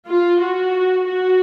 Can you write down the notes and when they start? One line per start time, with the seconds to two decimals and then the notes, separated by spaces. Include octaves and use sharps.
0.09 F4
0.42 F#4
1.08 F#4